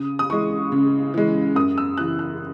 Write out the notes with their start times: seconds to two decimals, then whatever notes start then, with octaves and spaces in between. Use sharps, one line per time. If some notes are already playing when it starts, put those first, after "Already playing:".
Already playing: C#3 D#6
0.19 D#6
0.30 E3 G#3 C#6
0.72 C#3
1.14 E3 G#3
1.55 F#2 D#6
1.78 E6
1.97 C#3 E3 F#6
2.19 F#6